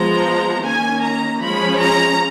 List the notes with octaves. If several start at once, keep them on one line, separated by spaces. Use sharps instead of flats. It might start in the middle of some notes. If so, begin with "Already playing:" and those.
Already playing: F3 G#3 B3 A#5
D#3 A#3 C#4 G#5
A#5
F3 G#3 C#4 B5
A#5